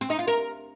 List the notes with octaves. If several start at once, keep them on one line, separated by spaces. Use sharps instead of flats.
C4
D#4
F4
A#4